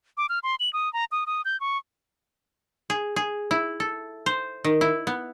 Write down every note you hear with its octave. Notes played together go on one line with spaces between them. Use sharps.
D6
F6
C6
F#7
D#6
A#5
D#6
D#6
G6
C#6
G#4
G#4
E4
A4
C5
D#3
E4
B3